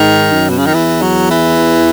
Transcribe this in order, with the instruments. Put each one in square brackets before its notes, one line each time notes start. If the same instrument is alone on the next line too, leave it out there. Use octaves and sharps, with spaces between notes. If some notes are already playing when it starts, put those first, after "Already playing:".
Already playing: [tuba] G#2 [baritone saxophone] D#3
[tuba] F#2
[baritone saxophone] B2
C#3
D#3
[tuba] E2 [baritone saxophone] E3
[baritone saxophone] F#3
E3